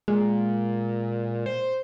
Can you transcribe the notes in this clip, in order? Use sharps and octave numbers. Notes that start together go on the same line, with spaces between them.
A#2 G#3
C5